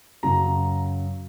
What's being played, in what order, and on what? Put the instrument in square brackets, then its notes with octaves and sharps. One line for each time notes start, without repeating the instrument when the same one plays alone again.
[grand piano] F#2 C#3 F#3 A#5